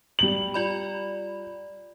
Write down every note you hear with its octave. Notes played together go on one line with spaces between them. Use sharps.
G3 F#7
F4 D5 B5